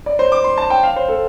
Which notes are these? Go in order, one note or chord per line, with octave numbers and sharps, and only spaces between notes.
D5
C5
D6
C6
A5
G5
F5
C5
A4